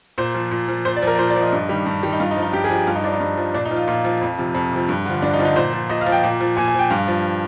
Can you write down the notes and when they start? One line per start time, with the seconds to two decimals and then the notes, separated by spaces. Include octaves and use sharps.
0.18 A#2 C5
0.35 F3
0.51 A#2
0.68 F3
0.85 A#2 C5
0.96 D5
1.02 F3 A#4
1.15 D5
1.19 A#2 C5
1.30 D5
1.36 F3
1.41 D#5
1.53 G2
1.69 D#3 G3
1.86 G2
2.03 D#3 G3
2.12 D#4
2.20 G2 F4
2.31 D#4
2.37 F3
2.42 D#4
2.53 G2 G4
2.64 G#4
2.70 F3
2.75 G4
2.87 G2 F4
2.95 D#4
3.04 F3 D4
3.13 D#4
3.20 G2
3.37 F3
3.54 A#2 D4
3.65 D#4
3.71 F3
3.76 F4
3.88 A#2 F4
4.05 F3
4.21 F2
4.38 C3 F3
4.55 F2
4.72 C3 F3
4.89 G2
5.06 D3 F3
5.22 G2 D4
5.34 D#4
5.39 D3 F3
5.45 D#4
5.56 A#2 C5
5.73 F3
5.90 A#2 D#5
6.01 F5
6.06 F3
6.12 G5
6.24 A#2
6.41 F3
6.57 A#2 G#5
6.68 G#5
6.74 F3 G5
6.90 G2 F5
7.08 F3